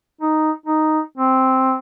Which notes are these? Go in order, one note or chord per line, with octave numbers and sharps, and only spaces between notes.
D#4
D#4
C4